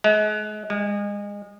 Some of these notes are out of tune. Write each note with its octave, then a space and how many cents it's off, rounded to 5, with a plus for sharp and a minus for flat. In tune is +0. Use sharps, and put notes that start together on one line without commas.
G#3 +35
G#3 -30